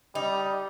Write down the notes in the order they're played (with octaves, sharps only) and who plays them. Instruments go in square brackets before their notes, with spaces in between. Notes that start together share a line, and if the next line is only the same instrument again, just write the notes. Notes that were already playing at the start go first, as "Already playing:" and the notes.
[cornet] G3 [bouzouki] D#4